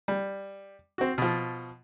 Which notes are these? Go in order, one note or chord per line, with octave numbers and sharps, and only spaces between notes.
G3
C4 F#4
B2 F3